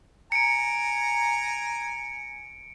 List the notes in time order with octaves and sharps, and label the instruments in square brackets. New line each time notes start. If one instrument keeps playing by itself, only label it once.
[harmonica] G#5 A#5 [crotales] C#7 D7